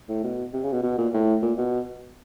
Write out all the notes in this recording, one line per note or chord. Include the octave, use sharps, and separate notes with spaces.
A2
B2
C3
C#3
B2
B2
A#2
A2
A#2
B2